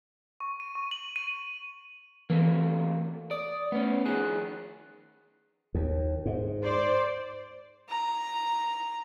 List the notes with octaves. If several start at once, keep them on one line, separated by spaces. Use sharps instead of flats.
C#6
D#7
C#6
F#7
D#7
C3 E3 A3 A#3
D5 D#6
A3 B3 C#4
D#3 F3 G#4 F#6
D#2
G#2
C5 D5
A#5